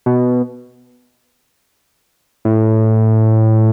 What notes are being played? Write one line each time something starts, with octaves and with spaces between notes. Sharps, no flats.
B2
A2